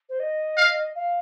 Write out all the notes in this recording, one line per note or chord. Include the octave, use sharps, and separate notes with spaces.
C5
D#5
F5
F5